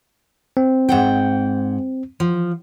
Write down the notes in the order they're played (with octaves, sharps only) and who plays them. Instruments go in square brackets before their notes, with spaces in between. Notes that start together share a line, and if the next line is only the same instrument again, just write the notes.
[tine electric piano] C4
[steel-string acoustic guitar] G#2 F#5 G5
F3